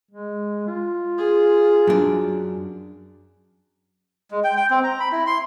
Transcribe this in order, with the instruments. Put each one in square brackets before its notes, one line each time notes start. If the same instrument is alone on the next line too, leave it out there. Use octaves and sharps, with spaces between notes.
[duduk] G#3
F4
[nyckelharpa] G#4
[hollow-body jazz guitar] F#2 D4
[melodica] G#3
G5
G5
C4
A#5
B5
E4
C6